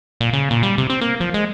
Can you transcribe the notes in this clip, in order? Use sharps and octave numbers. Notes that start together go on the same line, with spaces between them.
A#2
C#3
A#2
G3
C3
C4
A#3
F3
G#3